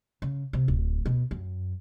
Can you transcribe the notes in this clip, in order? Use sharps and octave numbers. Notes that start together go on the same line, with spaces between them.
C#3
C3
D1
B2
F#2